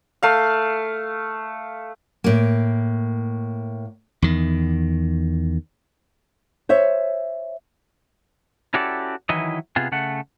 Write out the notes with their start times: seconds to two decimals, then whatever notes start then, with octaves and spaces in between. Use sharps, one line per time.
0.23 A3 F5
2.24 A2 A#3
4.22 E2 D#3
6.69 C5 C#5 E5
8.74 C#4 E4 F#4 G4 A4 D5
9.29 D#3 E3 F#3 E4 B4 D#5
9.76 C3 B3 F4 G#4
9.92 C#3 A3 F#5